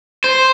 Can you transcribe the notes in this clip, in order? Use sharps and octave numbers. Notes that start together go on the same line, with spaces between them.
C5